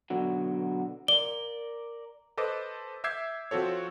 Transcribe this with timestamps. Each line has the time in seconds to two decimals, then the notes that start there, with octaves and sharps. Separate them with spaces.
0.10 B2 D3 F#3
1.08 A#4 D5 G7
2.38 A4 B4 C5 D#5 D6
3.04 E5 D6 E6 G6 G#6 C7
3.51 F3 C4 F#4 A4 C#5